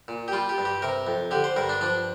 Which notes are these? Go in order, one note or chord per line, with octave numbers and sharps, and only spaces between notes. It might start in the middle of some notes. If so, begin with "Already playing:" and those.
A#2
G4
G3 F4
G4
G2
G4
C3 A#4
F2
D3 G4
C5
G2 A#4
D4
F3 D4